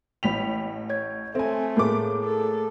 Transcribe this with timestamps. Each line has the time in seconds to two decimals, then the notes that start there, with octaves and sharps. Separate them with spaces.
0.23 A1 G5 B5 B6 F7
0.90 C#5 G#6
1.35 A3 C4 A4 E5 G#5
1.77 A2 A#3 G#4 A#4 D6
2.24 A4